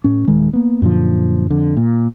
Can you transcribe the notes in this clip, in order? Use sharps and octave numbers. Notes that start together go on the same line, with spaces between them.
A2 C#4
D#1 D#3 G#3
A#3 B3
F#2 A#2 D3 F3
F2 D3
A#2